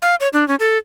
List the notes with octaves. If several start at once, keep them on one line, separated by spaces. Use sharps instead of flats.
F5
C#5
D4
C#4
A4